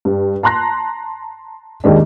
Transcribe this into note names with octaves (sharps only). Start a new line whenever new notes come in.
G2
A5 A#5 C6 F#6 A#6
D#2 D#3 G#3 D4